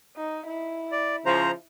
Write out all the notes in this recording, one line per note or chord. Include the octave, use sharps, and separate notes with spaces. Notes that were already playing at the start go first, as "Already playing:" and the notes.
D#4
E4
D5
C#3 F3 C5 A#5